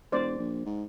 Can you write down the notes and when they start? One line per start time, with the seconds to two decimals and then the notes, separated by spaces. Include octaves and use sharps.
0.12 E1 C5 D5
0.39 A#1
0.66 G#2